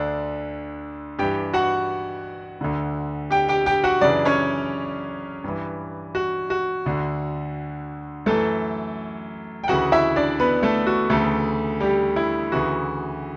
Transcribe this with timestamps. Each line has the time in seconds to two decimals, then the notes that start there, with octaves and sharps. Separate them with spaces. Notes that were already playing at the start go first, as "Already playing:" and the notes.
Already playing: D2 D3 D4
1.19 G2 E3 G4 G5
1.53 F#4 F#5
2.61 D2 D3
3.30 G4 G5
3.48 G4 G5
3.66 G4 G5
3.84 F#4 F#5
4.01 F#2 C#3 E3 D4 D5
4.25 C#4 C#5
5.44 G2 E3
6.15 F#4
6.50 F#4
6.86 D2 D3
8.26 F#2 E3 A3 A4
9.64 G5
9.68 D2 C#3 E3 F#4 F#5
9.92 E4 E5
10.16 D4 D5
10.40 B3 B4
10.63 A3 A4
10.86 F#4
11.10 D2 C#3 E3 A3 A4
11.80 G3 G4
12.16 E4
12.52 D2 C#3 E3 F#4